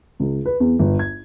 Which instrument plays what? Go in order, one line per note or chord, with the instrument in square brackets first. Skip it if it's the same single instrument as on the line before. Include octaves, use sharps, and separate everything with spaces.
[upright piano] C#2
B4
E2
G1
G#6